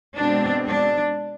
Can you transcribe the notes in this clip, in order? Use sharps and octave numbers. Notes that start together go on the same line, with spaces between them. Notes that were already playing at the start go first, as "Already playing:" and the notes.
B2 G#3 C4 D4
D4